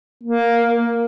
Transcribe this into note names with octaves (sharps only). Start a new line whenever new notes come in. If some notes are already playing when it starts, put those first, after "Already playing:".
A#3